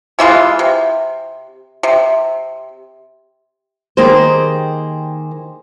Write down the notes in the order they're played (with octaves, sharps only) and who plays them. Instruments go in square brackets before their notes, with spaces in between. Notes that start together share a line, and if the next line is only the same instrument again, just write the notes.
[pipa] C3 E3 G#3 F4
C3
C3
[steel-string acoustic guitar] D#3 A#3 D#4 G4 G#4 C5